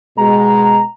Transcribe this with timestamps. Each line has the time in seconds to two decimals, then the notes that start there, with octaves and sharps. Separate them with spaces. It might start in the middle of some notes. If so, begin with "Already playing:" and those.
0.17 B2 G#3 A#5